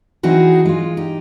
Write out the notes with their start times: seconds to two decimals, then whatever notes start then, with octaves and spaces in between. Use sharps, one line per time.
0.23 E3 C4 D#4 F#4 G#4
0.65 G#3 F4
0.97 D#4 G4